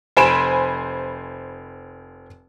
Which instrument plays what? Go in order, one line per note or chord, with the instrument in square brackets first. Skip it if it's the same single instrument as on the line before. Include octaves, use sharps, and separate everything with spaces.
[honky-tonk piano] F1 C5 G#5 B5 D7 E7